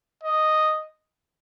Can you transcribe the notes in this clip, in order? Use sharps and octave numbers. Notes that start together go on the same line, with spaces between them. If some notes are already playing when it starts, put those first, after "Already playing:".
D#5